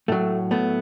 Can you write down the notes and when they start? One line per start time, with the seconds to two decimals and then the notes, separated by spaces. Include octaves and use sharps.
0.08 A2 F#3 A3
0.51 A3 B3